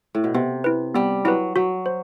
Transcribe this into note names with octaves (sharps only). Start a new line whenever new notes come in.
A2
B2
C3 B3
E4 B4
G3 B3
F#3 E4 B4
F#3 F#4
C5